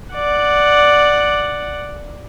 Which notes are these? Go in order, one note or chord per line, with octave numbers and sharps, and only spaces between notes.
D5 F#5